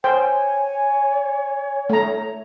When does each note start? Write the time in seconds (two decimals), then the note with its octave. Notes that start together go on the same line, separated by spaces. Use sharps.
0.04 C5 C#5 G5 G#5
1.90 A3 A#5